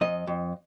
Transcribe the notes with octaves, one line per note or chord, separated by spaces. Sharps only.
F2 D#5
F2